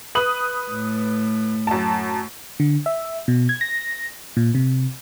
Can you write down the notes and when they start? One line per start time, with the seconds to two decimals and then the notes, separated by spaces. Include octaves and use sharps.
0.15 B4 D#6 F#7
0.71 A2
1.67 F#2 A5
2.60 D3
2.86 E5
3.28 B2
3.49 G#6
3.61 A#6
4.37 A#2
4.55 C3